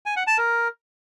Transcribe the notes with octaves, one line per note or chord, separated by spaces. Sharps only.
G#5
F#5
A5
A#4